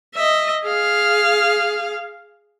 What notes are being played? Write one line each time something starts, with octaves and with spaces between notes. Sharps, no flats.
D#5 E5
G#4 F5